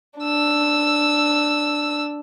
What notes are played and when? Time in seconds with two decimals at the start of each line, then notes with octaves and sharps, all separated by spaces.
0.20 D4 E6